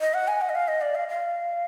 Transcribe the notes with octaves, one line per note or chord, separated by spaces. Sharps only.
D#5
F#5
G#5
F#5
D#5
F5
D#5
D5
F5
F5